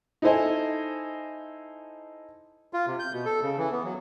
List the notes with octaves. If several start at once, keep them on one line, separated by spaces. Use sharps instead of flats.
D#4 E4 A4 C5 D#5 G#5
F4
C3
G6
B2
A4
C#3
E3
B3
F#3